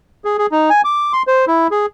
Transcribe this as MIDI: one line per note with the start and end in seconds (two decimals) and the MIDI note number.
0.25 0.37 68
0.39 0.46 68
0.52 0.70 63
0.70 0.82 80
0.84 1.13 86
1.13 1.23 84
1.27 1.45 72
1.47 1.67 64
1.71 1.86 68